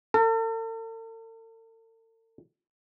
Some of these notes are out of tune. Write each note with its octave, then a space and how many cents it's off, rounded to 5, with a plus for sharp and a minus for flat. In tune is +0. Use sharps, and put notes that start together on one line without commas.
A4 +45